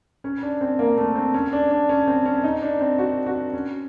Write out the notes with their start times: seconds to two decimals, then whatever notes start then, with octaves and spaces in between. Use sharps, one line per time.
0.24 C#4
0.42 D4
0.61 C4
0.79 A#3
0.97 A3
1.15 C4
1.34 C#4
1.53 D4
1.71 D4
1.89 C#4
2.07 C4
2.25 C#4
2.44 D#4
2.62 D4
2.81 C4
2.98 F#4
3.26 F#4
3.53 C#4